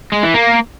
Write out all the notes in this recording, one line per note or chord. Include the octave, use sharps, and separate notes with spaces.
G#3
E3
A#3